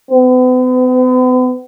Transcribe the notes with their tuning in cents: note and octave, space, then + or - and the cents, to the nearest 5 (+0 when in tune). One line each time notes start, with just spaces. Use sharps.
B3 +45